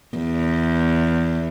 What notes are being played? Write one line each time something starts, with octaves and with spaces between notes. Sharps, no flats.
E2